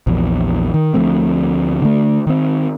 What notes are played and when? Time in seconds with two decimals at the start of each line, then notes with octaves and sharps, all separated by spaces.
0.07 A#1 E2
0.74 D#3
0.94 D2 F3 A3 C4
1.82 D3 A3
2.27 D#3 C4